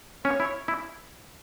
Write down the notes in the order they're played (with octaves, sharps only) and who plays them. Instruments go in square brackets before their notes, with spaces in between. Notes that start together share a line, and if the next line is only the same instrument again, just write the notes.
[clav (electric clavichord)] C#4 [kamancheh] C#5
[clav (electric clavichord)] E4
E4